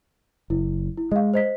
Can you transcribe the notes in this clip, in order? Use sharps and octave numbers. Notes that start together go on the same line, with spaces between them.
F#1 E4
E4
G#3 D#5 F5
C5 D#5 B6